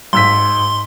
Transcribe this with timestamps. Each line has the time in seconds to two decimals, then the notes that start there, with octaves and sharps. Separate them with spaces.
0.13 G#1 G#2 C6 E6 B6